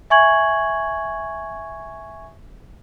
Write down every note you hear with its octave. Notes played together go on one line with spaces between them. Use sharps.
E5 G#5 C#6 G#6 F#7